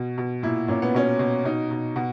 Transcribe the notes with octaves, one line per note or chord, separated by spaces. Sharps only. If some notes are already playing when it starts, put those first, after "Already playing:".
Already playing: B2
B2
A#2 E4
A#2 C#4
B3
B2 C#4
B2
B2 D#4
B2
B2 F#4